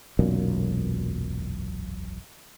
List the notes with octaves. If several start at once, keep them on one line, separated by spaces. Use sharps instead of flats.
E1 B1 F#2 A#2